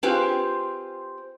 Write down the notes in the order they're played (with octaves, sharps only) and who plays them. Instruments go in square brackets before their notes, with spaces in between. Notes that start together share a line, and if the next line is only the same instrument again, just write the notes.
[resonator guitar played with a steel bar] C4 F4 G4 G#4 B4 C5